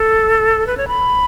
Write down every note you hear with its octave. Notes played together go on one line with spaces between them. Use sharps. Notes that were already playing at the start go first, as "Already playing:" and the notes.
Already playing: A4
B4
C#5
B5